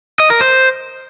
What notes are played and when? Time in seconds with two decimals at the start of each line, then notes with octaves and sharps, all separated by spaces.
0.20 D#5
0.30 A#4
0.41 C5